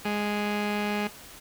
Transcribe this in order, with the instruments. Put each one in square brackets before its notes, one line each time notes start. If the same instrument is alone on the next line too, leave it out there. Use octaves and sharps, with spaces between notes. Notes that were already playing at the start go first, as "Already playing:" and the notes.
[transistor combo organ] G#3